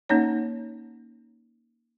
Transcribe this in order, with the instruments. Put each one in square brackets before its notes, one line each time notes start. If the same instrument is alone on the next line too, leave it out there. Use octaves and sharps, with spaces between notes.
[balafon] A#3 C#4 D#4 C#5